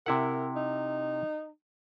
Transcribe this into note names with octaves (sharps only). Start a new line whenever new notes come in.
C3 E4 A#4 F#5
D#4